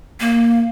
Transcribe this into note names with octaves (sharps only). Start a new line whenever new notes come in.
A#3